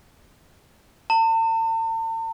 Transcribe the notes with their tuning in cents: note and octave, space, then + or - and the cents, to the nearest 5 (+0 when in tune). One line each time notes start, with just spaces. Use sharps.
A5 +45